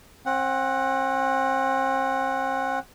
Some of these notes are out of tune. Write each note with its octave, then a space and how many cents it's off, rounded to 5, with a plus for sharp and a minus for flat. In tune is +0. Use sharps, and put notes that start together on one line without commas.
C4 +35 F#5 +0